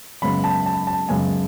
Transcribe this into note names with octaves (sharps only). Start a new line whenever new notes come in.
F#2 C#3 G#3 B3 B5
A5
A5
A5
F#2 C#3 G#3 B3 G#5